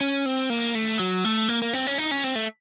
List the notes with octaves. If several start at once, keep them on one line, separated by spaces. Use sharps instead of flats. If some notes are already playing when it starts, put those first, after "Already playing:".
C#4
C4
A#3
A3
F#3
A3
A#3
A#3
C4
C#4
D#4
C#4
C4
A3